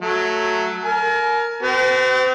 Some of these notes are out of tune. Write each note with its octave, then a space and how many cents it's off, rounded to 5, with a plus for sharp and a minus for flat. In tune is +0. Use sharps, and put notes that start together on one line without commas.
F#3 +0 A3 +0
A#4 +0 G#5 +40
C4 -35 F#4 +45